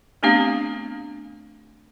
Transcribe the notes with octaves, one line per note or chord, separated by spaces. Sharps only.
A3 B3 C4 D4 G4 F5